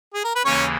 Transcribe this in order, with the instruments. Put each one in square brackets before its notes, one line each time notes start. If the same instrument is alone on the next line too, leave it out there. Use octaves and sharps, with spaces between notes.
[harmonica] G#4
A#4
B4
[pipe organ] D#2 C#3 E3 A#3 [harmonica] C#4 C#5